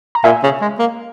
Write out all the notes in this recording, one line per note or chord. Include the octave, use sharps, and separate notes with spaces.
A#5
A#2 E5 G#5
C#3
G#3
A#3